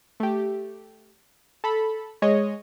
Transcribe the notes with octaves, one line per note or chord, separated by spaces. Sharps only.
A3 G4
A4 B5
G#3 C#5 D#5